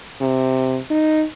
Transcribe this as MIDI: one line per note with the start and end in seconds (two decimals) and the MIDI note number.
0.21 0.79 48
0.91 1.25 63